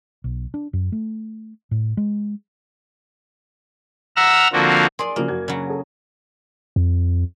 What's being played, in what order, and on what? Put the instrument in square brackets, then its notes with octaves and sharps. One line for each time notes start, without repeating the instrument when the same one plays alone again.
[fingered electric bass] B1
D4
F#2
A3
A2
G#3
[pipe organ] E5 F#5 A#5 E6 F6
D3 F3 A#3 C4 F#4
[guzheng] G#4 D5 [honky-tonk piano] A#4 C6
[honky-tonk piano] C#3 F3 F#4 [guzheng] A#3
[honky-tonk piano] F#2 F#4 G#6
[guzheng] C#3 F#3
[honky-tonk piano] G#4 A4
[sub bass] F2